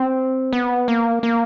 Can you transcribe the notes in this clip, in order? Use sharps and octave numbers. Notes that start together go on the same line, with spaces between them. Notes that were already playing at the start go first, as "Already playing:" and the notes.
Already playing: C4
B3
A#3
A#3